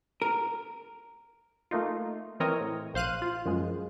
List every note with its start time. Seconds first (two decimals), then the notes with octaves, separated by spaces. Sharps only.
0.22 A#4
1.71 A3 A#3 D#4 F4
2.40 E3 C4 A#4 C#5 D#5
2.61 A2
2.94 A#1 C5 F5 F#6 D#7
3.22 F4
3.46 F#2 F3 G#3